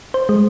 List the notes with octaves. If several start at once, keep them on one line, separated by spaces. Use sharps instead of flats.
C5
G#3